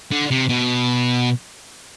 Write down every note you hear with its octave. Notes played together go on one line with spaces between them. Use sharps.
D3
C3
B2